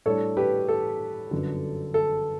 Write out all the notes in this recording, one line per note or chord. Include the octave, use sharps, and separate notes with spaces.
A2 G3 D4 A4 C#5
G4 B4
A4
G1 F#2 D3
A4